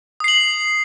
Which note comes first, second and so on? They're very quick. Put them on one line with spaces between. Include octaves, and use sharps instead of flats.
D#6 C7 F#7